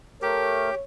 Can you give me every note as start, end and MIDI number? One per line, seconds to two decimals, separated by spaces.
0.22 0.70 57
0.22 0.75 67
0.22 0.70 70
0.22 0.84 73